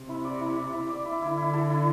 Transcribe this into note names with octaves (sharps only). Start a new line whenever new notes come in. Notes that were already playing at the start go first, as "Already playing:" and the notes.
Already playing: C3
E4
D5
E4
E4
E4
D5
E4
D3 E4
E4
A4
E4